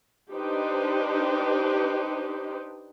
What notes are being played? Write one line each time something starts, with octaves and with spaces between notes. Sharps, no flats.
D4 D#4 G4 B4 C5